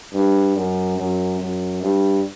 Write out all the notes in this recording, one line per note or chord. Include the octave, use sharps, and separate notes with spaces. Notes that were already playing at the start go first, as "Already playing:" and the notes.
G2
F#2
F#2
F#2
G2